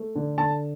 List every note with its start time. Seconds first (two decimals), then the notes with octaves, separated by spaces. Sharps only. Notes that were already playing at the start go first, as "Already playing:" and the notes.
Already playing: A3
0.15 D3
0.38 D3 A5